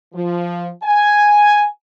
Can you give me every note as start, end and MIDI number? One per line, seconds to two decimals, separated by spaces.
0.13 0.68 53
0.83 1.64 80